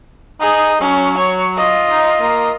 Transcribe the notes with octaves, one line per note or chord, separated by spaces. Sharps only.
D#4 G#4
F#3 C#4
C#5
F4 D#5
D#4
A#3